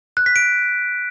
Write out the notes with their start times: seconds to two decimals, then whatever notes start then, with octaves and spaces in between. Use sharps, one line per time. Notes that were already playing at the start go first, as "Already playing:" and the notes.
0.17 F#6
0.26 B6
0.36 D7